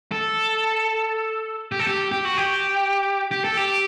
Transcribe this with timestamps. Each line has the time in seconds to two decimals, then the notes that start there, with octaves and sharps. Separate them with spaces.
0.12 A4
1.72 G4
1.79 A4
1.87 G4
2.12 G4
2.25 F#4
2.38 G4
3.31 G4
3.44 A4
3.57 G4